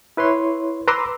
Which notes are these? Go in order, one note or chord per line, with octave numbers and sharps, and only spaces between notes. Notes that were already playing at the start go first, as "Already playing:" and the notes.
E4 B4 C#5 C6
B4 A#5 C6 D6 E6